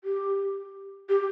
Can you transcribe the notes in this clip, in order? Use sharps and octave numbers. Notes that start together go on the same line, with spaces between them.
G4
G4